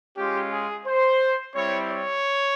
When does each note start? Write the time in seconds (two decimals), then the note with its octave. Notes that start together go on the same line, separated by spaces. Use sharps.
0.17 G#3 C#4 F4 G4
0.52 G#4
0.86 C5
1.54 G3 C4 E4 C#5
1.88 C#5